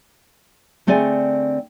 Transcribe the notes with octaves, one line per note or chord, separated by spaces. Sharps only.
D3 A3 C4 G#4 D5 G#5